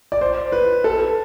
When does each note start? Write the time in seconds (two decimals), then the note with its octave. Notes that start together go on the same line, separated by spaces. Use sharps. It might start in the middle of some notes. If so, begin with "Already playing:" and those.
0.12 D5
0.21 C5
0.52 B4
0.84 A4